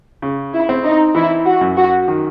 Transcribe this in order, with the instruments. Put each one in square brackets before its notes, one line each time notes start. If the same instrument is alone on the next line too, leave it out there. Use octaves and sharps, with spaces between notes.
[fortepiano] C#3
[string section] E4
[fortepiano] C4
[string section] D#4
[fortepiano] E3 [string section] E4
[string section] F#4
[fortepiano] F#2
[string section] F#4
[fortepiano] D#3